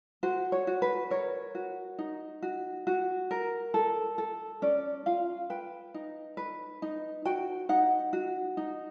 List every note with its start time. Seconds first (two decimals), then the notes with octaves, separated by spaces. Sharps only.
0.23 F#4 C5
0.52 C#5
0.67 F#4
0.82 B4
1.10 A#4 C#5
1.55 F#4
1.99 D#4
2.42 F#4
2.87 F#4
3.31 A#4
3.74 A4
4.18 A4
4.62 C#4 D5
5.06 F4 F5
5.50 B4 G5
5.94 D#4
6.37 B4
6.82 D#4
7.25 F#4 G5
7.69 D#4 F#5
8.13 F#4
8.57 D#4